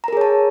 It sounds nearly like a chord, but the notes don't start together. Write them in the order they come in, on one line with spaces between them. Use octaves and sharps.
A#5 A#4 G#4 C#5 A5